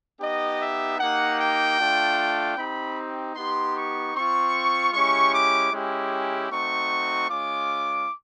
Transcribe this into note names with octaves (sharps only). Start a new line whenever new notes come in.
B3 D#4 G4 D#5
E5
A#3 D#4 G4 F#5
G5
A3 D4 F4
C4 D#4 G4 B5
B3 D#4 G4 C6
C#6
C4 F4 C#6
G#3 C#4 E4 G4 C#6
D6
G#3 C#4 E4 G4
A3 C4 D#4 F#4 C#6
G#3 C#4 F4 D6